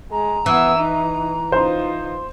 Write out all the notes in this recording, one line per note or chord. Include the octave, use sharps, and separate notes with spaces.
G#3 A#5
E3 B3 E6
D#4
D#4 F4 C5 C6